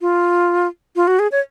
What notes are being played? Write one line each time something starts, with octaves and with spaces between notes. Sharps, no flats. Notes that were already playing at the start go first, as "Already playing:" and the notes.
F4
F4
F#4
G#4
C#5